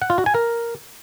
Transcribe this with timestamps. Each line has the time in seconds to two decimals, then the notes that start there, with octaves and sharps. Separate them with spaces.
0.02 F#5
0.10 F4
0.18 F#4
0.26 G#5
0.35 A#4